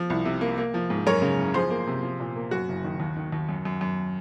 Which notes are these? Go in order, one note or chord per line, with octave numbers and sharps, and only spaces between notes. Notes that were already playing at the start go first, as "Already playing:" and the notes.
Already playing: F3
C2
C3
A#3
A#3
F3
G#2
F#2 A#4 C#5
C#3
F#1
F3 G#4 C5
A#3
C3
F3
A#2
A#3
F#2 F#4
F#1
D#3
D#2
D#3
D#2
F#2
F#2
F#2